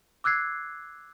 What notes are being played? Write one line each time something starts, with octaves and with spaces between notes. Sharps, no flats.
D6 E6 F#6 G#6 C7